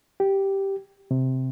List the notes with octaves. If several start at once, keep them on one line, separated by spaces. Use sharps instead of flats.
G4
C3